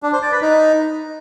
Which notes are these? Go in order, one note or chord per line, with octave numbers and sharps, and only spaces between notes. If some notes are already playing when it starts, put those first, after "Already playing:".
D4
C5
D5
B4
D#4